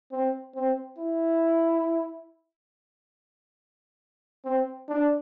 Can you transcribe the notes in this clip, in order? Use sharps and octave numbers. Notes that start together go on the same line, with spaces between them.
C4
C4
E4
C4
D4